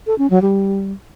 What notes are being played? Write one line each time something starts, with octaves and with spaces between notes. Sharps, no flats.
A4
C#4
F#3
G3